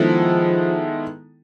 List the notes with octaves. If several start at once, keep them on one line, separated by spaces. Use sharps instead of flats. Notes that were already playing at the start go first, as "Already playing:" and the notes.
Already playing: D#3 F3 G#3 B3 E4 A4